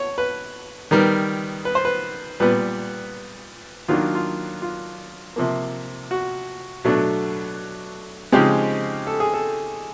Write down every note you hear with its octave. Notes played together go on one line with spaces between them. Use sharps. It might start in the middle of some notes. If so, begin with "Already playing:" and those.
Already playing: C#5
B4
D#3 G3 B3 A#4
B4
C5
B4
A#2 G3 B3 B4
D#3 F#3 A#3 D4 F4
F4
F4
C3 F3 A#3
F#4
B2 F#3 A3 D4
C#3 F3 G#3 C4 D#4 G4
A4
G#4
A4